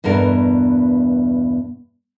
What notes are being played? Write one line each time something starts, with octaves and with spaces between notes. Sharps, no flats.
E2 G2 B2 A#4